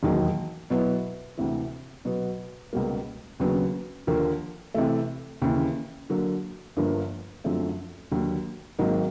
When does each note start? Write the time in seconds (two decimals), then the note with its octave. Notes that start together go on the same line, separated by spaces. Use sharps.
0.03 E1 D#2 D#3 F#3
0.70 B2 F#3 B3 E4
1.37 D2 C3 E3
2.05 B2 F#3 B3
2.73 C#2 B2 G3 A#3
3.40 D#2 C#3 F#3 B3 D4
4.07 D#2 D3 F3 A#3
4.74 C3 E3 A3
5.42 D#2 C#3 E3
6.10 D3 F#3 A#3
6.77 G1 G2 D3 F3 A#3
7.44 F#2 D3 F3 A3 C4
8.11 D#2 D3 F#3
8.79 G#1 G#2 D#3 F#3 A#3